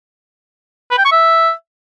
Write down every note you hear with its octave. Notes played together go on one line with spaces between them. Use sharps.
B4
G5
C#6
E5